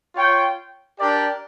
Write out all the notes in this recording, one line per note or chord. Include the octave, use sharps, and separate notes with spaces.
F4 C#5 G5
D4 G4 A#4 D5